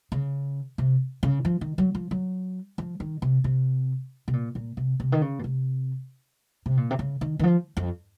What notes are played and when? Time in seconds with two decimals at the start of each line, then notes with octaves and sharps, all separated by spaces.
0.12 C#3
0.78 C3
1.23 C#3
1.45 F3
1.61 D#3
1.78 F#3
1.95 F3
2.11 F#3
2.78 F3
3.00 D#3
3.22 C3
3.44 C3
4.28 C3
4.33 A#2
4.55 A#2
4.77 C3
5.00 C3
5.12 D#3
5.22 C#3
5.39 A#2
5.44 C3
6.66 C3
6.77 A#2
6.91 C3
6.99 C#3
7.21 D#3
7.39 D#3
7.43 F3
7.77 F2